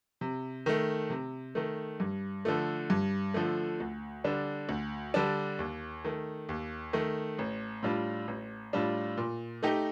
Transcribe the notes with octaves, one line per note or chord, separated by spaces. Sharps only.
C3
D#3 A3
C3
D#3 A3
G2
D3 F3 A3
G2
D3 F3 A3
D2
D3 G3 D4
D2
D3 G3 D4
D#2
D#3 A3
D#2
D#3 A3
A1
A2 G3 D4 F4
A1
A2 G3 D4 F4
A#2
A3 D#4 G4